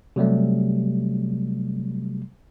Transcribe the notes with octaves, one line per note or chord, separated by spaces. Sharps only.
C3 F#3 G3 A3